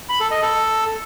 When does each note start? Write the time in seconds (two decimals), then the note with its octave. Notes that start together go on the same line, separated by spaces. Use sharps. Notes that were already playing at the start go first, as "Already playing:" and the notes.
0.09 B5
0.20 A4
0.31 D#5
0.42 A4